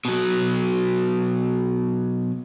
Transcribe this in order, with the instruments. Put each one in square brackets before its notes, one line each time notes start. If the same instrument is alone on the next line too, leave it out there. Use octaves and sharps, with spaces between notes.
[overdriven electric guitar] B2 F#3